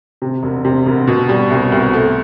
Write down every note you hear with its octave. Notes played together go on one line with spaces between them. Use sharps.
C3
E1
C3
E1
B2
G3
C2
C2
A3